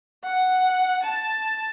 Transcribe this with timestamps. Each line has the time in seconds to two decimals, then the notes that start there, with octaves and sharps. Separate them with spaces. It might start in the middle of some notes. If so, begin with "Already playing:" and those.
0.24 F#5
1.04 A5